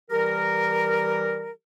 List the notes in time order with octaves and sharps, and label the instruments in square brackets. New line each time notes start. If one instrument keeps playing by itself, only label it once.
[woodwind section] E3 G3 G4 A#4